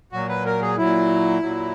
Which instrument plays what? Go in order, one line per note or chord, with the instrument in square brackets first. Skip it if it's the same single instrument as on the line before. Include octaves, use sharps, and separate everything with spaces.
[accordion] A#2 F#3 F#4
B4
A#4
G#4
A#2 F#3 E4
A#2 F#3